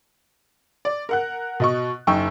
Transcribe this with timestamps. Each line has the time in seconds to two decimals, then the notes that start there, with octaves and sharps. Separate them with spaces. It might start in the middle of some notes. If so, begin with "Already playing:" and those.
0.85 D5
1.09 A#4 F#5 F#6
1.60 B2 D#5 C#6
2.07 F#1 F#2 D#4 G5 C#6 E6